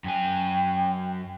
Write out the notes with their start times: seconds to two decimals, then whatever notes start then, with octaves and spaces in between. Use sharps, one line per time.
0.04 F#2 G5 G#5